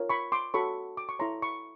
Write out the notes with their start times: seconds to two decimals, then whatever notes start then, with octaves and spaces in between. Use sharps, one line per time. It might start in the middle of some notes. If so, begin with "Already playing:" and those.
Already playing: F4 A#4 C#5
0.10 B5 C#6
0.32 C6 D6
0.54 F#4 A4 C#5 B5 C#6
0.97 D6
1.09 C#6
1.19 E4 A4 C#5 A#5 C6
1.42 B5 C#6